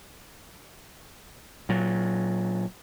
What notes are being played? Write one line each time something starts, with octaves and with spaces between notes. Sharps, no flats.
A#2 F#3